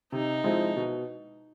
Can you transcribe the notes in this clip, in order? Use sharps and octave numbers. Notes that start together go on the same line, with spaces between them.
C3 D#4
F3 G#3 C4 E4
B2